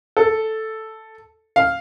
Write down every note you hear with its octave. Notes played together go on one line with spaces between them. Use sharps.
A4
F5